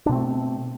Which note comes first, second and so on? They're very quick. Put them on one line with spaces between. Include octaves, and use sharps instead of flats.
D4 B2 C4 A3